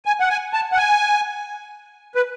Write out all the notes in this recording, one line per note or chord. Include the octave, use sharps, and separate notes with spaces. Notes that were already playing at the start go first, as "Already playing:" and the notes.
G#5
F#5
G#5
A5
F#5
G#5
B4